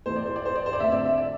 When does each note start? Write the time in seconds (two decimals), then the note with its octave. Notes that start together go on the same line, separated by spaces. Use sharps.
0.06 A2 E3 A3 C5
0.16 D5
0.26 C5
0.36 D5
0.46 C5
0.56 D5
0.66 C5
0.73 D5
0.80 D3 A3 C4 E5
0.92 D5
1.05 E5
1.18 D5